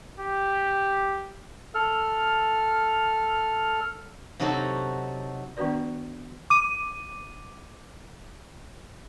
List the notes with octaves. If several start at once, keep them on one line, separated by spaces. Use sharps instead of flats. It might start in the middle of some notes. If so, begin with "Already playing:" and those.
G4
A4 F6
C3 F#3 D#4 F#4 A4
D#3 B3 D4 F#4 B4 D5
D6 D#7